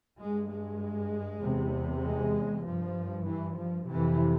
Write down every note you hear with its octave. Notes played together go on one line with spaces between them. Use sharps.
G2 G#3
G#3
E2 C3
G#3
G2 F3
E3
F3
F2 C3 E3